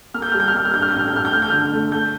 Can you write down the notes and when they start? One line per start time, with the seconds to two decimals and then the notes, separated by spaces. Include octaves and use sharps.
0.14 A#3 F6
0.22 G6
0.32 G3 F6
0.40 G6
0.48 F6
0.54 A#3 G6
0.65 F6
0.73 G2 G6
0.82 F6
0.91 A1 G6
0.99 F6
1.08 G6
1.12 A1 F6
1.25 G6
1.33 A3 F6
1.42 G6
1.50 D3 F6
1.73 A3
1.91 A3 G6